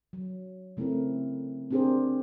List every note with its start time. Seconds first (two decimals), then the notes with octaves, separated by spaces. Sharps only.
0.13 F#3
0.77 C#3 A3 C4 E4 A#4
1.71 C4 D4 G4 G#4 A#4 C5